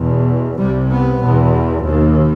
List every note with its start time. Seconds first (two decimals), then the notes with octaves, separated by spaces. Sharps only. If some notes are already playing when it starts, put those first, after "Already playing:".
Already playing: E2 B2
0.56 C2 C3 G3
0.89 B3
1.21 E2 B2
1.85 D#2